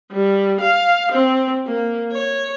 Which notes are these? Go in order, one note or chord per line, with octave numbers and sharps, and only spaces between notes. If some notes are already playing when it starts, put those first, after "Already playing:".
G3
F5
C4
A#3
C#5